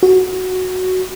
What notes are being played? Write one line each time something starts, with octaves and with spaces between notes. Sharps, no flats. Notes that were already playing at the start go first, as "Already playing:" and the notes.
F#4